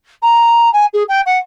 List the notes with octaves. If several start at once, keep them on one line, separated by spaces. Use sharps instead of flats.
A#5
G#5
G#4
G5
F#5